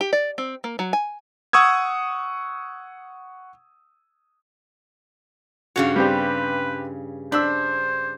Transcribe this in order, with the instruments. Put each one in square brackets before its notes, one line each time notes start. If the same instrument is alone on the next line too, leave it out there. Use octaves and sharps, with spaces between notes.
[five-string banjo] G4
D5
C4
A#3
F#3
G#5
[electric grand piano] F#5 C#6 D#6 E6 G#6
[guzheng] G2 C#3 C#5 [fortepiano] F#4
[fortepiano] G3 C4 G4 [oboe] B4
[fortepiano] D4 E6 [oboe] C5 [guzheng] B5